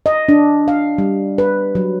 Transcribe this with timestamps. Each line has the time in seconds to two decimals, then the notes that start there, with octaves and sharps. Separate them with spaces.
0.06 D#5
0.29 D4
0.68 F5
0.98 G3
1.38 B4
1.75 F#3